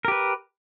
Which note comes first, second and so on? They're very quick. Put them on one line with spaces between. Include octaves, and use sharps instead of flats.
A#4 G4 B4